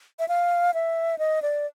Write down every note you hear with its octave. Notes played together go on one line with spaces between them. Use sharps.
E5
F5
E5
D#5
D5